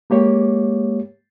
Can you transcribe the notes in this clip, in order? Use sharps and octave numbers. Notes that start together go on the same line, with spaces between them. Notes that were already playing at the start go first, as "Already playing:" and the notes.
G#3 A#3 G4 C#5